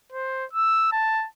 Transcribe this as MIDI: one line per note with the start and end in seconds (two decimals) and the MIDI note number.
0.12 0.45 72
0.53 0.91 88
0.92 1.27 81